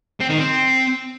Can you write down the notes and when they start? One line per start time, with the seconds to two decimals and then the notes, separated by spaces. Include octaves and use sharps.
0.21 C4
0.30 D#3
0.38 C4